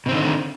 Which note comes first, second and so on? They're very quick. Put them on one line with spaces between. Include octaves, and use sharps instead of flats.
B2 C4 D#3 D3